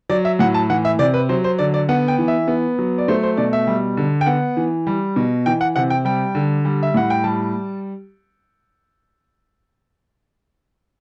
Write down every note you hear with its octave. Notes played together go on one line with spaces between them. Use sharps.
F#3 D5
E5
A2 F#5
A5
E3 F#5
E5
C3 D5
B4
F#3 C5
C5
D3 D5
D5
B3 F#5
G5
E3
E5
B3
F#3
D5
A3 C5
C5
B2 D5
E5
G3
D3
G5
B3 F#5
E3
G3
B2
E3 G5
F#5
C3 F#5
G5
G3 G5
D3
G3
E5
A2 F#5
G5
G3 A5